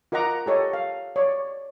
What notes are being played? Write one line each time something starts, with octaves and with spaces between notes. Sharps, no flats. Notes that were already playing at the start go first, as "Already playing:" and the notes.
F4 A#4 D#5 F#5 A#5 D6
G4 A4 C#5 D#5
F5
C#5 D5